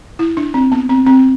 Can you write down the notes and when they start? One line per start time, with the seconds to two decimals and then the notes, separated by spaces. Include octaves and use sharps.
0.19 E4
0.37 D4
0.54 C4
0.72 B3
0.89 C4
1.07 C4